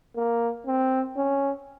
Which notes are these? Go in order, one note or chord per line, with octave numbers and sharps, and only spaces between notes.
A#3
C4
C#4